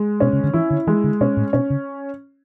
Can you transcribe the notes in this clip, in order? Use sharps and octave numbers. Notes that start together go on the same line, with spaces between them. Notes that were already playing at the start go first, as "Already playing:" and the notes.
Already playing: G#3
B2 C#4
C#3
D3
E3 E4
D3
E3 G#3
D3
B2 C#4
A2
B2 C#4
C#3